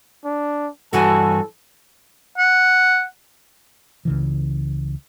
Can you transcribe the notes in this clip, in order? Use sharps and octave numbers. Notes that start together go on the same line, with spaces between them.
D4
G2 E3 F#4 A4 G#5 A5
F#5
C#2 C#3 E3